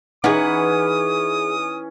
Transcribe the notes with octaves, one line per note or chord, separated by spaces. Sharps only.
E3 C#4 D#4 G#4 B4 F#5 D#6